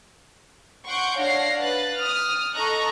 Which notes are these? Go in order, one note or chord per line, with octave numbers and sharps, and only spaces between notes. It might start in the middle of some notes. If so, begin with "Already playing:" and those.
F#5 C6 C#6 G6 D7
D4 C#5 F5 F#5 A#6 C7
B4 F#6 A6
D#6 F6
A4 D#5 A#5 C#6 F#6